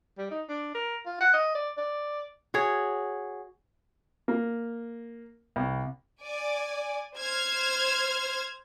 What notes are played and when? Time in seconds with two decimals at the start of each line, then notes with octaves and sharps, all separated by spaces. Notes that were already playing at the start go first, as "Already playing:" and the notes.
0.18 G3
0.31 D#4
0.49 D4
0.75 A#4
1.06 F4
1.21 F#5
1.33 D#5
1.55 D5
1.77 D5
2.54 F#4 G#4 C#5
4.28 A#3
5.56 C2
6.21 D5 G#5
7.20 C5 F6 G#6